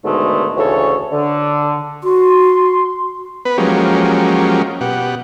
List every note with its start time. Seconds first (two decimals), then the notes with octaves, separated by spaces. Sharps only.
0.05 G#2 B2 D3 D#3 G#3 A3
0.57 D2 C#3 E3 A4 C#5
1.12 D3
2.04 F#4 C6
3.45 B3 B4
3.58 F3 F#3 G#3 A#3 C#4 G4
4.81 B2 G4 F#5